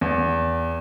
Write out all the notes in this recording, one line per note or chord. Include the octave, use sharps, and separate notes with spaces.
E2